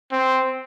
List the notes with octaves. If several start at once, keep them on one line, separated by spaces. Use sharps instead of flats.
C4